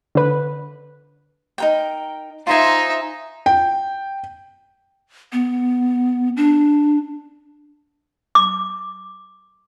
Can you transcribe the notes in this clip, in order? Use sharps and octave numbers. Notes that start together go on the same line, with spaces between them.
D3 B4
D#4 A#4 G5
D#4 F4 C5 E5 G#5
G5
B3
D4
D6